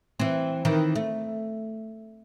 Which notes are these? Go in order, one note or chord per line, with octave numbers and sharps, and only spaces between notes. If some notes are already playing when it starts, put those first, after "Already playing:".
E3 C4
D#3 E3
A3